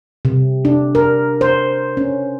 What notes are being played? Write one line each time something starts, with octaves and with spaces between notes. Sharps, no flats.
C3
D4
A#4
C5
C#4